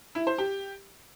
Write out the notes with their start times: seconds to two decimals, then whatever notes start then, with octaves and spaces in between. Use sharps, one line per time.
0.15 E4
0.27 C5
0.38 G4